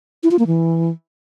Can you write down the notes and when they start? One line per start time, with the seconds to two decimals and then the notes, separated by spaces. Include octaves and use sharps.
0.23 E4
0.31 F4
0.39 A#3
0.47 E3